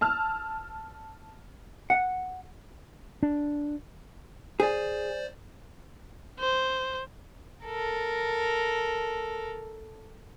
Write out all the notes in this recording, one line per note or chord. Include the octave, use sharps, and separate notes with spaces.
A5 E6 F6
F#5
D4
G#4 C5 D5
C5
A4 A#4